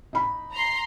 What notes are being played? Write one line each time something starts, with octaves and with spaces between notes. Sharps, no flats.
D#4 B5
A#5 C6